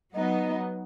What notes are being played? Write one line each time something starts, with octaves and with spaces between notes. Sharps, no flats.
F#3 B3 D#4